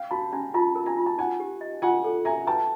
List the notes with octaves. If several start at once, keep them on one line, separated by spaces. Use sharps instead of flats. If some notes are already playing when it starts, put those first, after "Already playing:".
Already playing: F5 G5
F#4 A5 B5
C#4 G#5 A#5
F4 A5 B5
A#4
G#5 A#5
F4
A5
D#4 F#5 G#5
G4
D#5
F4 F#5 G#5
A4
E5 G#5 A#5
B4 G5 A5